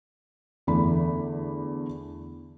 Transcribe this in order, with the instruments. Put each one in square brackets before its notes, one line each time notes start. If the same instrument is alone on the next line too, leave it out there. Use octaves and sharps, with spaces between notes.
[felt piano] E2 D3 A3 D4 B5